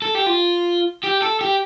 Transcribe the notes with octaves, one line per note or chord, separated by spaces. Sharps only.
A4
G4
F4
G4
A4
G4